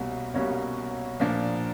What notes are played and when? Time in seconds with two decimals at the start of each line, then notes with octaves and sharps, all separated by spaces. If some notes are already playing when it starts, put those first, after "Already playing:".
Already playing: C2 B2 G3 A#3 C#4
0.34 C2 B2 G3 A#3 C#4 C#5
1.20 A#2 F3 A#3 D4 F4